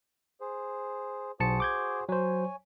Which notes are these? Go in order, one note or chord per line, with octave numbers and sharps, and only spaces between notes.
G#4 C5
B1 F#4 G#4 C5 A5 C#7
D6 G6 G#6
F#3 C5 C#5 G#5